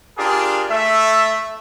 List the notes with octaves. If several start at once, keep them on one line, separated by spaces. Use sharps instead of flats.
D4 F4 G4 G#4 A#4
A3 E5